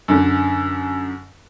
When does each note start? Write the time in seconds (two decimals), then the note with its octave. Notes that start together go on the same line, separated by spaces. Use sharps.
0.08 F#2 D3